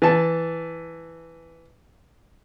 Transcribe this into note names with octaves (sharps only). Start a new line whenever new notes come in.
E3 A5